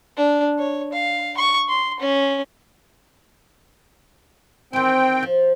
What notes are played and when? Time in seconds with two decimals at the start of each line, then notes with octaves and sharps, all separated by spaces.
0.17 D4
0.59 C#5
0.93 F5
1.37 C#6
1.68 C6
2.00 C#4
4.73 D#3 E3 C4 G5
5.23 F3